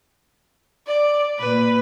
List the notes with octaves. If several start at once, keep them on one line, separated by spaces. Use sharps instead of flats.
D5
A#2 B4